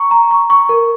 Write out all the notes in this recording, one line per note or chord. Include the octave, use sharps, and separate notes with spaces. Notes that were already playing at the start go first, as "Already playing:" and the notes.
Already playing: A#5 C#6
A#5
C#6
C#6
A#4